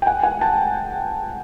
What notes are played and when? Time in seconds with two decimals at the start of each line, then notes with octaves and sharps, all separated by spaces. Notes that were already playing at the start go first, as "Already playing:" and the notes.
0.02 G5
0.06 F#5 G#5
0.23 F#5 G#5
0.41 G5 A5